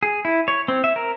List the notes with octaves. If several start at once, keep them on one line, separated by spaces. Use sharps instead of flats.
G#4
E4
C#5
C4
E5
A#4